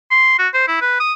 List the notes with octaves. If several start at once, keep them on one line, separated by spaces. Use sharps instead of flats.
C6
F#4
C5
E4
B4
D#6